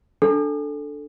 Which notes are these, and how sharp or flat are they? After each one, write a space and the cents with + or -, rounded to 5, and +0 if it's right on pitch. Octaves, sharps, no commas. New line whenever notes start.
D4 +0 A4 +0